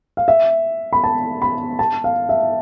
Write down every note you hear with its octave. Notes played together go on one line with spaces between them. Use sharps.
F5
E5
B5
A5
B5
A5
F5
E5